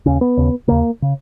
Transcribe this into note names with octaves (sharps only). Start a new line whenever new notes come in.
D#2 C#3 C#4
B3
D#2 C#3
D#2 C#3 A#3
C#3